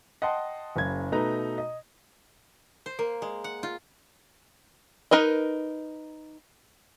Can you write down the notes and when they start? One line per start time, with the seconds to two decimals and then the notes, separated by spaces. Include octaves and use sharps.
0.22 D#5 F#5 G5 A5 C6
0.76 F#1 C#3 G#6
1.12 B2 A3 D#4 B4 A#5
1.58 D#5
2.86 C5
2.99 A#3
3.22 G#3
3.44 F#5
3.63 F4
5.11 D#4 A#4 B4 D#5